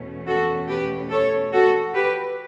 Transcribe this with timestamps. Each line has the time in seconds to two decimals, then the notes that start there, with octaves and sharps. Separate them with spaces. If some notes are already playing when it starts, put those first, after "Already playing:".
Already playing: E2 B2 A3 C#4
0.27 F#4 A4
0.69 G4 B4
1.11 A4 C#5
1.53 F#4 A4
1.94 G4 B4